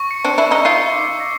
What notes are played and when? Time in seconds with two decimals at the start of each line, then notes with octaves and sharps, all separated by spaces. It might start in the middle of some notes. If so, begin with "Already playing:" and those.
Already playing: C#6
0.11 C#7
0.24 C4 D4
0.38 D4 E4 E6
0.51 C#4 D#4
0.65 D#4 F4 C7
0.92 D6
1.20 A#6